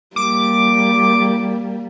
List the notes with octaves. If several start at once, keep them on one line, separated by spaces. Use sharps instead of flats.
G3 A#3 D6